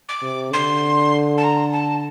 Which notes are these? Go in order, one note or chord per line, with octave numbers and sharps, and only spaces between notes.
D6
C3
D3 C6
A5
A#5
A5